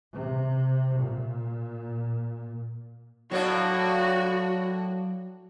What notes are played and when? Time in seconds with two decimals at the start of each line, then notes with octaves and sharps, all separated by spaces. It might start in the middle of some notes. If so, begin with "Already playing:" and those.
0.15 C3
0.98 A#2
3.31 A2 F#3 A#3 D4 F#4 C#5 F5